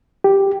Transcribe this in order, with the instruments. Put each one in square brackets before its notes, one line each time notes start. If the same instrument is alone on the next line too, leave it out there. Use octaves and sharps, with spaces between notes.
[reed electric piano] G4